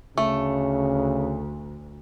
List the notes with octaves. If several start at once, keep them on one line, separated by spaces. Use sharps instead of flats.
D2 C#3 A3